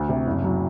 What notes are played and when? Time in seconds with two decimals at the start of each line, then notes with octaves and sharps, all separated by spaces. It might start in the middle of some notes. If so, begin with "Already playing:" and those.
Already playing: D2
0.09 C3
0.26 F#1
0.44 F#3